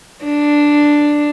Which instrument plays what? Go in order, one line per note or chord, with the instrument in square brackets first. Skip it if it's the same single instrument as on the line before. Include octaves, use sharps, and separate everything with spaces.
[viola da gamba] D4